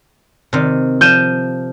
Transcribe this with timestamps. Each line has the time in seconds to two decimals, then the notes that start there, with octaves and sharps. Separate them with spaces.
0.53 C3 D#3
1.01 F3 G6 D#7 E7